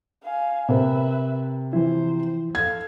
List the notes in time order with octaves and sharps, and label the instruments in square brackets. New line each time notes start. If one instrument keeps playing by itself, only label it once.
[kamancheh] F5 G#5
[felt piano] C3 A#4 [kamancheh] B4 E5
[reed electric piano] E3 F3 E4 [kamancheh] C5
[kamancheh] A4 F5 [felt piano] G#6